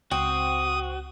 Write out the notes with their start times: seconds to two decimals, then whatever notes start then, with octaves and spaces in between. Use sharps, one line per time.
0.11 C#2 C4 F#4 D#6